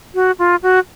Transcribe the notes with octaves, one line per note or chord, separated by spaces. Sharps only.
F#4
F4
F#4